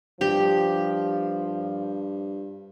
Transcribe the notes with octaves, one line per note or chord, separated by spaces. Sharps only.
G2 F3 G4